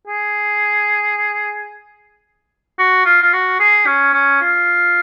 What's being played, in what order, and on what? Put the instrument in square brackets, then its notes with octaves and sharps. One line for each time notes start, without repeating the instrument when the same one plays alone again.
[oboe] G#4
F#4
F4
F4
F#4
G#4
C#4
C#4
F4